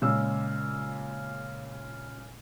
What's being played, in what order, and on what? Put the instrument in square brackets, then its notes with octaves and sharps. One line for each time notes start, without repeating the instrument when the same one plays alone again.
[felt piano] A#2 C#3 G#3 E6